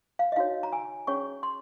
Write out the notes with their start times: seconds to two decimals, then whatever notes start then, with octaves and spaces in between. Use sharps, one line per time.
0.19 F5
0.32 D#5
0.36 D#4 F#4 C#5 F5
0.63 A#5
0.73 G#5
1.07 C#4 G#4 C#5 C#6
1.43 C6